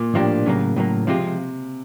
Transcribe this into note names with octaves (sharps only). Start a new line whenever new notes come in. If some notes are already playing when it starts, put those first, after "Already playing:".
Already playing: A#2
A2 F3 A#3 D4 G4
A2 C#3 F#3 A#3
A2 F#3 A#3
C3 F3 G#3 C4 F4